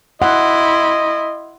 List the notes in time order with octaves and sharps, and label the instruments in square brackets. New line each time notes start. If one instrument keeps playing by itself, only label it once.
[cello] E4 [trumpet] D#5 [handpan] F#5 [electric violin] C6